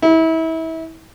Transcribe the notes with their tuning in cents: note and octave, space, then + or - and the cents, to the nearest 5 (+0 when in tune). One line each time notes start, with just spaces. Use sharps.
E4 -30